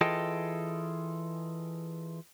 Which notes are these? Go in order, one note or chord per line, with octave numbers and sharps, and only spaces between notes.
E3 F4 G#4 A4 D#5 G5